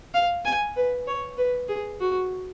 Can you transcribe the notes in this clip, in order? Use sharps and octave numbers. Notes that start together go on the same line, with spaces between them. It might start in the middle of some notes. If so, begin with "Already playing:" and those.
F5
G#5
B4
C#5
B4
G#4
F#4